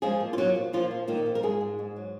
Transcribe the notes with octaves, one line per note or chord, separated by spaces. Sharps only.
F3 G#3 G#4
A#2
F4
A#2 F#3 F#4
F3
A#2 F3 F4
F3
A#2 D#3 D#4
F3
A#4
G#2 G#3 G#4
G#2
G#2
F#3